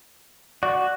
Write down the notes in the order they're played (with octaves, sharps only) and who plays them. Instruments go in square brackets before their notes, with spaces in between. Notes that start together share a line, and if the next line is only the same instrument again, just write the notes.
[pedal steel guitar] F#4 [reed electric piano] D5